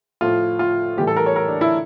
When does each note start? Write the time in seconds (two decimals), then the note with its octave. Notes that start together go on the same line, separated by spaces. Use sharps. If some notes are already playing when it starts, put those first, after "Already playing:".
0.21 A2 F3 F4
0.59 F4
0.98 A2 E3 G3 G4
1.07 A4
1.16 A#4
1.26 C#5
1.36 A#4
1.48 D4
1.61 E4